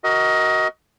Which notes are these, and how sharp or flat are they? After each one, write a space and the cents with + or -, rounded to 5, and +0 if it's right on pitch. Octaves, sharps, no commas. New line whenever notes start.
F#4 +15 A#4 +0 D#5 +20